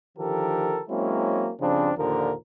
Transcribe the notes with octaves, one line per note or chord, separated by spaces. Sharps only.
D3 D#3 F3 G4 A4 A#4
F#3 G#3 A#3 C4 C#4 E4
G2 C#3 F3 C4 D4
A#1 D#2 A#2 D3 F3 A#4